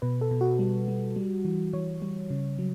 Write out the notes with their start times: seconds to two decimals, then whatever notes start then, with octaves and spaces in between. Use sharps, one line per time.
0.02 B2 B4
0.21 A4
0.31 B2
0.41 F#4
0.59 G3
0.88 G3
1.16 G3
1.45 E3
1.73 E3 C#5
2.02 G3
2.30 C#3
2.59 F#3